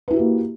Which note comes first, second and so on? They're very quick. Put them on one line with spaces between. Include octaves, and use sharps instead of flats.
B4 E4 F#4 G4 A#3